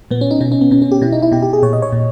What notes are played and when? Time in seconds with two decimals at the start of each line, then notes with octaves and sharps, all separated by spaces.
0.11 A#2 B3
0.21 C#4
0.31 D#4
0.41 B2 C#4
0.52 C#4
0.61 B3
0.71 B2 C#4
0.82 C#4
0.92 G4
1.02 B2 E4
1.12 D#4
1.22 E4
1.32 B2 G4
1.42 G4
1.53 G#4
1.63 A#2 C#5
1.73 D#5
1.82 C#5
1.93 A#2